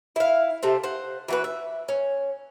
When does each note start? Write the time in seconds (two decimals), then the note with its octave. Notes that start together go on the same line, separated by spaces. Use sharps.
0.16 E4 F5
0.63 C3 A3 C4
0.84 C5 F#5
1.28 E3 F#4 B4
1.44 E5
1.88 C#4